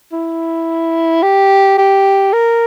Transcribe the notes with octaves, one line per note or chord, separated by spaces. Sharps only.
E4
G4
G4
A#4